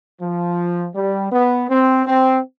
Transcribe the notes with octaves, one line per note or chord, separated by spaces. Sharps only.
F3
G3
B3
C4
C4